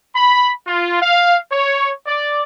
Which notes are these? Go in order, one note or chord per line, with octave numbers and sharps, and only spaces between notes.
B5
F4
F5
C#5
D5